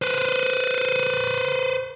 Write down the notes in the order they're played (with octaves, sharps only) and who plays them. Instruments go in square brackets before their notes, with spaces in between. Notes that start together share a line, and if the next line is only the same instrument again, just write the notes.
[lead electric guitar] B4 C5